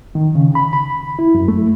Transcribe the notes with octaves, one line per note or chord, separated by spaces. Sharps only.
D#3
C#3
B5
B5
E4
F#2
A3